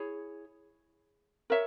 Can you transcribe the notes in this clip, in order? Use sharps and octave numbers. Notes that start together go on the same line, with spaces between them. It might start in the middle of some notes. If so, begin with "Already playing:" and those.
Already playing: E4 G#4 C#5
A#4 C#5 E5